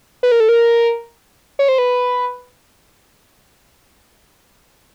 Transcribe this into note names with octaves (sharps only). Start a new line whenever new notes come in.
B4
A#4
A4
A#4
C#5
C5
B4